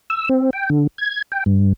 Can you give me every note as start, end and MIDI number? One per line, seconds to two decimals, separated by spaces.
0.10 0.29 88
0.29 0.50 60
0.53 0.70 79
0.70 0.87 50
0.98 1.22 92
1.32 1.44 79
1.46 1.73 43